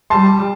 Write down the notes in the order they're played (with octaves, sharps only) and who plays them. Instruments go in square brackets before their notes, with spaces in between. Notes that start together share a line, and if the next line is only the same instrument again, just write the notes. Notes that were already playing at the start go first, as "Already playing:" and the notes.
[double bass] G3 [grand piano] A5 C6